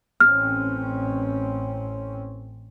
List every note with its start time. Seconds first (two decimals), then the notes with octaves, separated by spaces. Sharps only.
0.20 A1 C4 C#4 F6